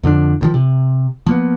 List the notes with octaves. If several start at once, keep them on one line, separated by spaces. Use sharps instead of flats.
F2 D3 F3 D4
D2 D#3 F3
C3
F3 A#3 B3